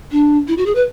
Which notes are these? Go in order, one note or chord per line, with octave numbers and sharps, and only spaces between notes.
D4
E4
F#4
G#4
B4